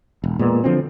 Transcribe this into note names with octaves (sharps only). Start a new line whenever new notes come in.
E1
A#2 G#3 B3
D3 F3 F#3 C4